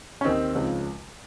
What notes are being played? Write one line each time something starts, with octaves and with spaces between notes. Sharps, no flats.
C#4
D#2 D#3 C4 D#4
C#2 C#3 F3